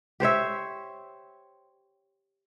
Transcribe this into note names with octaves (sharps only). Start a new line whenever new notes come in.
G4 C5 C#5 E5